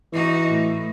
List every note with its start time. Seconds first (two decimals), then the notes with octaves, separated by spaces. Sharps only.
0.12 E3 D#4 F#4
0.47 A2